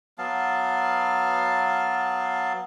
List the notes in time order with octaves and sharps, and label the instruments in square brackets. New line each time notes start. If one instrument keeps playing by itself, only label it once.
[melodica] F#3 B3 F5 A5